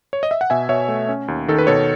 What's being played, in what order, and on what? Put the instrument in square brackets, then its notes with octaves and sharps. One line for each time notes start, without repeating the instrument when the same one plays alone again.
[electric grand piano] C#5
D#5
E5
F#5
B2 E5 G#5
B2 C#5 E5
A3
C#4
D#2
D#3 A4
B4
B2 A4 C#5